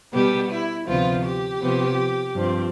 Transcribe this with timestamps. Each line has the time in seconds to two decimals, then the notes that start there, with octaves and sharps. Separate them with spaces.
0.12 B2 G3 B3 G4
0.50 E4
0.86 D2 C3 F3 B3 F4
1.24 G4
1.60 C3 F3 B3
2.34 G2 F3 C4